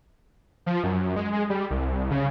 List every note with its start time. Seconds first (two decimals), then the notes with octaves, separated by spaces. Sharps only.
0.66 F3
0.84 F#2
1.16 G#3
1.33 G#3
1.50 G3
1.71 C2
2.11 C#3